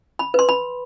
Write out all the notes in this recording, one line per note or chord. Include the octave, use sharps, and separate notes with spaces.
B5
B4 C6
B5